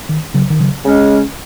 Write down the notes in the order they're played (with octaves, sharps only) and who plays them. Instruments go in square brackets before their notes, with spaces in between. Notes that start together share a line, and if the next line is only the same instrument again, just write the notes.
[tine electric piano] D#3
C#3 F#3
D#3
C#3 F#3
[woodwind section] C#3 G#3 C#4